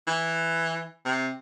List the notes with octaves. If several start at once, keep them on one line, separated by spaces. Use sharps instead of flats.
E3
C3